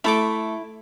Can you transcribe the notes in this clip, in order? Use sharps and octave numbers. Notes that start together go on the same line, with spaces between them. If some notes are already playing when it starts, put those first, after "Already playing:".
A3 E4 A4 D6